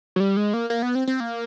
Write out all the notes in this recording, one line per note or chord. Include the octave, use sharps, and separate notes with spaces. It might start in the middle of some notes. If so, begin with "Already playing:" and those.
F#3
G3
G#3
A#3
A#3
B3
C4
C4
A#3